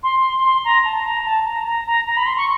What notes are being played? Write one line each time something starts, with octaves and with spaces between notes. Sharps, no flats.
C6
C6
A#5
A5
A#5
A5
A#5
A#5
A#5
A#5
B5
C6
C#6